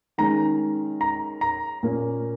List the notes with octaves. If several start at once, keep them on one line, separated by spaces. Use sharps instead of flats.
D#3 G#3 C#4 A#5
A#5
A#5
A#2 A#3 C#4